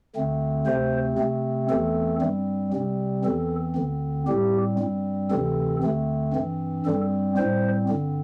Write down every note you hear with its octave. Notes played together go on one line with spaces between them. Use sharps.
D2 D3 A3 C4
D2 C3 A3 C4 C5
C3 A3 C4
E2 E3 A3 C4 A4
G2 G3 C4
C3 G3 C4
E2 E3 C4 A4
D2 D3 C4
A2 G3 C4 G4
G2 G3 C4
D2 C3 E3 C4 A4
D2 D3 A3 C4
G2 E3 C4
G2 G3 C4 A4
A2 G3 C4 C5
G2 D3 C4